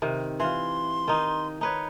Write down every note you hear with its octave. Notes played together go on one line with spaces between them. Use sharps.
C3 D#3
E3 F4 C6
D#3 D#4
D#4 B4 C#5